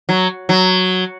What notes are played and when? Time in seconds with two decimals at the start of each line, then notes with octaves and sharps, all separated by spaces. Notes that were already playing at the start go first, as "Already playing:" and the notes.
0.09 F#3
0.49 F#3